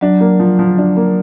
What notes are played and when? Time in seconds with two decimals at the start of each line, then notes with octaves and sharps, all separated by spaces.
0.01 F#3 D4
0.21 A#3
0.40 F3
0.59 F3
0.78 D4
0.97 A#3